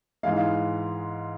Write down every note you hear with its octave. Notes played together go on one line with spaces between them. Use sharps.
G#2 E3 G#3 F5